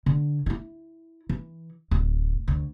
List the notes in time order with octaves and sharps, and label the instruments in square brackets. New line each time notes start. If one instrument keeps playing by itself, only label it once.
[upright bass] D3
D#4 E4
E3
D1
D2